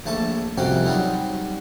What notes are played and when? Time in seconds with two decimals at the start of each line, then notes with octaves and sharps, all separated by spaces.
0.06 A#1 A3 A5 C#6
0.58 C2 F2 C3 C#4 F#4 G5
0.85 F#3 G3 C4 D#4